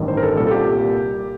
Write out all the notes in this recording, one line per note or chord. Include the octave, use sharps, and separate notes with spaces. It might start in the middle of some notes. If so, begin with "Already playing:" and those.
Already playing: A1 G2 D#3
C5
A#4
A4
C2 A#2 G3 A#3 A4
A4
G4